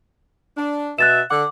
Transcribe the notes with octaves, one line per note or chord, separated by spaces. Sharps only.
D4
B2 E5 F#6 A6 E7
D3 F#5 D6